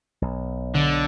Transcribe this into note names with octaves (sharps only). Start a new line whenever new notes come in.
B1
D3